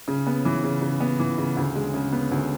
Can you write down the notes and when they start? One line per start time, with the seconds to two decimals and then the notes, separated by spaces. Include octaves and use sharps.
0.08 C#3
0.27 B3
0.45 E3
0.64 C#3
0.82 C#3
1.00 B3
1.20 E3
1.38 C#3
1.57 D2
1.75 G#3
1.94 C#3
2.12 B3
2.31 D2